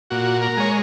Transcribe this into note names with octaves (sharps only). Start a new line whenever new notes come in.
A#2 F#4
A#4
G#3 C#5